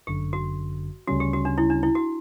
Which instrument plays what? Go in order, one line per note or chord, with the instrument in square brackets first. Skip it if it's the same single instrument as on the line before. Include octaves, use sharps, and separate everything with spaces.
[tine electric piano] G1 F#2 D3 [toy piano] G4
[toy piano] F#4
[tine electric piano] D2 C#3 G3 C#4 [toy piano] F#4
[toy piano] G4
F#4
D4
E4
D4
E4
F#4